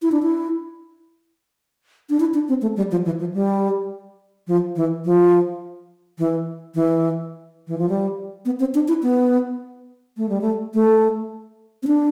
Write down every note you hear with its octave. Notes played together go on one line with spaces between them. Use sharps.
E4
D4
E4
D4
E4
D4
C4
A3
G3
F3
E3
F3
G3
F3
E3
F3
E3
E3
E3
F3
G3
B3
C4
D4
E4
B3
A3
G3
A3
A3
C4
D4